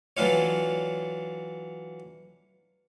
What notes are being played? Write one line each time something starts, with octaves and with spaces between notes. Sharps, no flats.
E3 F#3 D4 F4 C#5